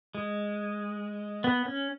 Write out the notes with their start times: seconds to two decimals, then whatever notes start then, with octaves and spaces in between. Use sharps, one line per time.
0.15 G#3
1.44 B3
1.65 C#4